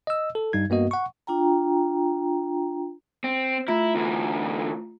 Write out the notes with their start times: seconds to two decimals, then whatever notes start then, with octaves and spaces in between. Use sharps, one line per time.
0.07 D#5 E6
0.35 A4
0.53 G2 G3 D#4 G#6
0.70 G2 A#3 B3 F#4 D#5
0.91 F#5 C#6
1.27 D4 F4 G5 A#5
3.24 C4
3.68 A3 E4 F4 A#5
3.95 D2 E3